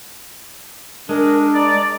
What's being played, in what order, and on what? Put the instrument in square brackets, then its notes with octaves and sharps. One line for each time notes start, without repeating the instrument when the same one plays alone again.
[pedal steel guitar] G#3 [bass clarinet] D4 [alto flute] A#4
[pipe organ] D5 [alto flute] A#5